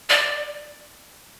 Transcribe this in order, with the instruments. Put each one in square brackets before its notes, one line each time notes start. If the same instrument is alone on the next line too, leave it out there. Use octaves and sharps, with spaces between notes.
[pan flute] D5